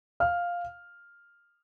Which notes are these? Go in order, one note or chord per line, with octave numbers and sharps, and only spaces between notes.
F5 F6